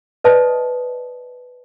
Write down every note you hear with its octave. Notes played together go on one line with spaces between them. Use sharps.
B4 D5 D#5 A5 D#6